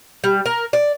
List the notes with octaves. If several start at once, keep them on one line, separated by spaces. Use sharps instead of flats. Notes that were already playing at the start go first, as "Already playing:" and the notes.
G3
A#4
D5